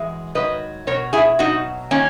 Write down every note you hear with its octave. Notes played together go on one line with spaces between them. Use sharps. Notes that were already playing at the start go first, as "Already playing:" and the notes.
Already playing: F#2 E3 G#3
G#2 D#3 F#3 B4 D#5
B2 F#3 A#4 C#5
E4 G#4
B2 F#3 D#4 F#4
D#3 F#3 A#3 C#4